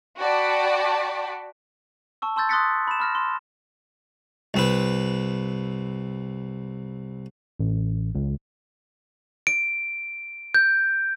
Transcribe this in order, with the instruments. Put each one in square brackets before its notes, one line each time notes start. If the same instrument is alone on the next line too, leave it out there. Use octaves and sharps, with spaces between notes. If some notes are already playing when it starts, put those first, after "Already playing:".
[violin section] F#4 D5 F#5 G5 A5 B5
[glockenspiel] A5 C#6 E6
A5 C6 E6 G6 A6
C6 D#6 F#6 A6 B6 C#7
B5 E7
B5 F6 A#6
C6
[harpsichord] C2 C4 B4
[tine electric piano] A1
C#2
[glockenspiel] D7
G6